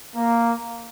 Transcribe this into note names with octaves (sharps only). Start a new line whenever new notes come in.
A#3